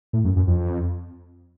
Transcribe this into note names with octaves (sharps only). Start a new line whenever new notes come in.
A2
F#2
F#2
F2